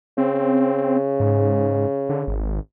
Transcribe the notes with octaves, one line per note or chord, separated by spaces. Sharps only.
C#3 C4
G#2
D3
G#1